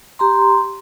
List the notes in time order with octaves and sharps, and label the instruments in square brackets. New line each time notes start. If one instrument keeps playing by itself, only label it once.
[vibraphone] G4 A#5 C6